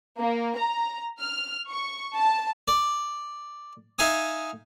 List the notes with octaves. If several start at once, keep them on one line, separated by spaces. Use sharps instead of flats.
A#3
A#5
F6
C#6
A5
D5
D#4 E5 F5 G#5 D#6